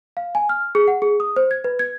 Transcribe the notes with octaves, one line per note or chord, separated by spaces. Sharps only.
F5
G#5
F6
G#4
F#5
G#4
D#6
C5
G#6
B4
G#6